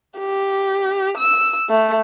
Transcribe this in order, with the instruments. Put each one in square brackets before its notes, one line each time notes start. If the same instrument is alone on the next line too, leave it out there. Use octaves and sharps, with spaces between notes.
[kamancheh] G4
E6
A3